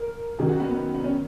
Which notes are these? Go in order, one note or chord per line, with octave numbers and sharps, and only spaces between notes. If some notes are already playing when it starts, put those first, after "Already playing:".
Already playing: A#4
F#2 D#3 F#3 G#4
F#4
B3
B3
B3
C#4